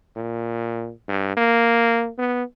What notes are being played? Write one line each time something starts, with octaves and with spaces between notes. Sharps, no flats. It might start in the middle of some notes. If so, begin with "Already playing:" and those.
A#2
G2
A#3
B3